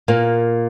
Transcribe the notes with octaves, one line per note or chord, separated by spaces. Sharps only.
A#2 A#3